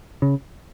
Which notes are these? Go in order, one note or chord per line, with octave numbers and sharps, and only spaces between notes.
C#3